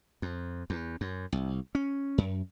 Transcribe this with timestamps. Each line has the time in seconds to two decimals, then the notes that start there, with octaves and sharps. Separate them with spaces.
0.22 F2
0.70 E2
1.01 F#2
1.32 C2
1.75 C#4
2.18 F#2